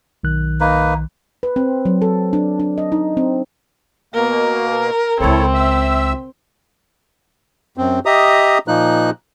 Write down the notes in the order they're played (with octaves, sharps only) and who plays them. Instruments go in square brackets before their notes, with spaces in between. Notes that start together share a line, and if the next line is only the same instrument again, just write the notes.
[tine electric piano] B1 D#3 F#6
[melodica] A#3 D#4 B4
[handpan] B4
C4
F#3
A4
D4
D4
D#5
D#4
C4
[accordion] B2 A#3 [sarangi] A#4
[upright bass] C#2 C#3 [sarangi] C4 [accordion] E4 A4 C#5
[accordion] E5 E6
[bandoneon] F#2 C4
G4 D#5 E5 A#5 D#6
A#2 F3 A#3 D#4 F#6